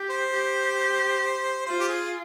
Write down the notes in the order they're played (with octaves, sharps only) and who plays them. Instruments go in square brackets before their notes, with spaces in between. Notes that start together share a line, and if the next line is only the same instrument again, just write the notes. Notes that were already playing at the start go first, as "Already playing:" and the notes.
Already playing: [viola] G4
[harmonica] C5
[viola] G4
[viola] F4 [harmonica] C5
[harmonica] G4
G#4